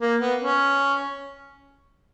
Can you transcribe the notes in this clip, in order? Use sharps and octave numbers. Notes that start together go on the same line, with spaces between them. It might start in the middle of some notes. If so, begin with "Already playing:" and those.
A#3
B3
C#4